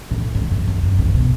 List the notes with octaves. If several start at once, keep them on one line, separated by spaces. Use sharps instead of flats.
A2
G#2
F#2
F#2
F#2
A2
B2